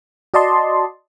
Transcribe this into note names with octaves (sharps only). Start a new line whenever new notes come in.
F#4 D5 D#5 A5 C6